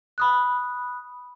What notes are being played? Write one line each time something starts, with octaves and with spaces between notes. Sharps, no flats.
B5 D#6 F#6